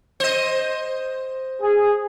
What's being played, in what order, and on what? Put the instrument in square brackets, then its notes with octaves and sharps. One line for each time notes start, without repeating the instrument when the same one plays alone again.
[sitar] C5 D#5
[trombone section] G#4